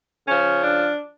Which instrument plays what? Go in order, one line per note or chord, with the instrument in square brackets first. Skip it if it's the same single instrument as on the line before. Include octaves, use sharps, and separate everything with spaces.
[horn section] C#3 F3 C#4
D4